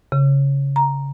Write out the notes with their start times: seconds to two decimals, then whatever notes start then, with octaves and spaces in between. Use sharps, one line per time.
0.12 C#3
0.76 A#5